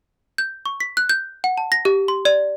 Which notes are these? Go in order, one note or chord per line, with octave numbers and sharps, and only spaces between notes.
G6
C#6
B6
F#6
G6
F#5
A5
A#6
G4
C6
D5